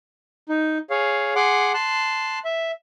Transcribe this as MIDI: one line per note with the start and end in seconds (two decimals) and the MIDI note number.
0.49 0.78 63
0.90 1.34 68
0.90 1.34 73
0.90 1.34 77
1.36 1.72 68
1.36 1.72 78
1.36 1.72 84
1.36 1.72 86
1.74 2.39 81
1.74 2.39 84
1.74 2.39 90
2.45 2.71 76